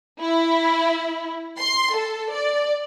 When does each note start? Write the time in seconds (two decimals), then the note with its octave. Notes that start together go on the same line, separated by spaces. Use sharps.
0.21 E4
1.58 C6
1.96 A4
2.33 D5